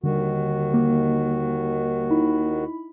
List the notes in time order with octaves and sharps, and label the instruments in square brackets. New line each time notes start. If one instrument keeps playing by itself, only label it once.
[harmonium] D#2 D#3 F#4 [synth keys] D3 G3
[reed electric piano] A#3
[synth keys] D#4 E4 B5